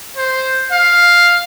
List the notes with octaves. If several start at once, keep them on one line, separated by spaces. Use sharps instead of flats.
C5
F5